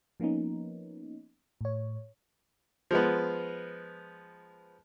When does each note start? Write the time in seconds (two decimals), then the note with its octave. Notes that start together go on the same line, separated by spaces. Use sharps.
0.20 F3 A#3 B3 C#4 D#4
1.61 A2 C#5
2.91 F3 G#3 B3